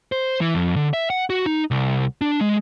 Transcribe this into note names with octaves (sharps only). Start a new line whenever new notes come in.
C5
E3
F2
D3
E5
F#5
F#4
D#4
C2
D4
G#3